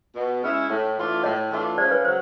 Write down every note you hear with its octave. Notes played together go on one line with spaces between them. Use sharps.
B2
G#3 C#4 E4
A2
E3 A3 D4 F4
A2 C#5 D#5
E3 A3 D4 F4
C#3 C5 D5
B4 C#5
F#3 C5